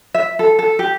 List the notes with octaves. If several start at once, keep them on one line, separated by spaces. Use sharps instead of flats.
E5
A4
A4
G4